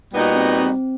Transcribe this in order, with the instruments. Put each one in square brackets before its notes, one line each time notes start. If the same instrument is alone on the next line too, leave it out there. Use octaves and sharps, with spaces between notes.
[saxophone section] A#2 G3 B3 D#4 F#4
[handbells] C4
C4